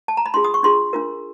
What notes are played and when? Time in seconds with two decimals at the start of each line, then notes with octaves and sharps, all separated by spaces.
0.08 A5
0.17 A#5
0.26 B5
0.34 D4 F4 G#4 C6
0.44 D#6
0.54 C#6
0.63 D4 F4 G#4 C6
0.93 D4 F4 A#4